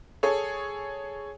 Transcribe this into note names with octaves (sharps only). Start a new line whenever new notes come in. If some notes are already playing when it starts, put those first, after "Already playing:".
G#4 A4 C#5